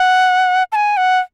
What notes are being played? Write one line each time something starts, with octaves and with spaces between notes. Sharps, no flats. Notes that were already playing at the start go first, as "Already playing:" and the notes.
Already playing: F#5
A5
G#5
F#5